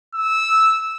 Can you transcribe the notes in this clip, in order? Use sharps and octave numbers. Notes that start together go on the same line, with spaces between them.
E6